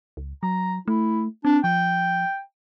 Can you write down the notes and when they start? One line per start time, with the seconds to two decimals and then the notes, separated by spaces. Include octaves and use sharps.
0.17 C#2
0.43 F#3 A#5
0.88 A3 E4
1.45 C4 D4
1.64 F3 G5